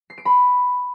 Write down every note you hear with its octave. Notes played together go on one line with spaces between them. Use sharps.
C7
D7
B5